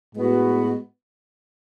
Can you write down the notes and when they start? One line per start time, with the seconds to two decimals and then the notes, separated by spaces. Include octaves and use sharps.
0.14 A2 G#3 B3 F#4 B4